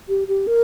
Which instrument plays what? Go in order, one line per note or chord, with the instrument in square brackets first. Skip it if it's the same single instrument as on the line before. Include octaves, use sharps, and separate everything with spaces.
[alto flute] G4
G4
A#4